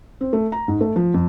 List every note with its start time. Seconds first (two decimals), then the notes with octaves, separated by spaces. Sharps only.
0.21 C4
0.33 A3
0.52 A#5
0.68 G#2
0.81 A3
0.96 F3
1.14 F2